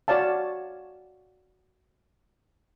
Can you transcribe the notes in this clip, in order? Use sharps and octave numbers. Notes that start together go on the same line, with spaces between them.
F#4 C#5 D5 F5 A5